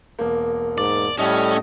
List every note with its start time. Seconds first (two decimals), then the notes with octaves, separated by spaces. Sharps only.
0.19 E1 A#3
0.78 G#2 D5
1.18 A2 G3 A3 C#4 D#5